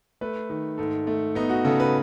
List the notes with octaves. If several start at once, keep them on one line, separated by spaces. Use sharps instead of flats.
A3 B4
D#3
G#2 A4
A3
B3 D#4
F#4
C#3 A4
B4